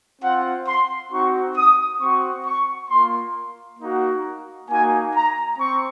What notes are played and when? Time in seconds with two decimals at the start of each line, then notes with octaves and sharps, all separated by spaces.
0.21 C4 F4 F#5
0.66 C6
1.11 C4 D#4 F#4 C#6
1.55 D#6
2.01 C4 F#4 C#6
2.46 C#6
2.90 A#3 F4 C6
3.80 A#3 D#4 F#4
4.69 A#3 D#4 F#4 G#5
5.14 A#5
5.58 C4 C#6